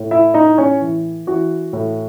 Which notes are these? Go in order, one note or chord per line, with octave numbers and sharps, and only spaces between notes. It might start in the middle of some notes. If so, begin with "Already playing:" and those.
Already playing: A2
E4 E5
A2 D#4 D#5
C#4 C#5
E3
E3 F#4
A2